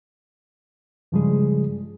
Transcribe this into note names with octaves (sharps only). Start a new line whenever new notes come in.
G2 C#3 F3 G3 G#3 G#4